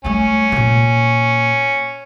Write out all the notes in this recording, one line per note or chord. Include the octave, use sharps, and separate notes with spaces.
G3 A3 C#4
A#2 A#3